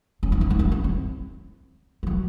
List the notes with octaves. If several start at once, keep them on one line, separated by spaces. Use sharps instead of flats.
C#4
D#4
C#4
D#4
C#4
C4
C4
F3
F#3